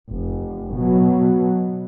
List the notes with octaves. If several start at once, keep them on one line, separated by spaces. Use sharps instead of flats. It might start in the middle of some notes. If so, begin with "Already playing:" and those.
F1
B2 F#3